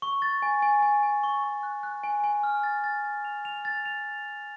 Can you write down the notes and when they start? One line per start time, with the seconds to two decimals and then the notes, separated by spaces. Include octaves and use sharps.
0.02 C#6
0.22 A6
0.42 G#5
0.62 G#5
0.82 G#5
1.03 G#5
1.23 C#6
1.44 C#6
1.63 F#6
1.83 F#6
2.03 G#5
2.24 G#5
2.43 F6
2.63 A6
2.84 A6
3.05 A6
3.25 F7
3.45 F7
3.65 A6
3.86 F7